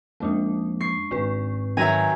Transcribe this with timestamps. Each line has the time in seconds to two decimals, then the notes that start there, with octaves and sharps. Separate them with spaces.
0.20 F2 F3 G#3 A#3 C#4 D4
0.80 C#6 C7
1.11 G#1 G#2 C4 F#4 B4
1.77 D#3 F#3 E5 G#5 A#5